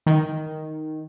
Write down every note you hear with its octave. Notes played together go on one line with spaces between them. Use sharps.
D#3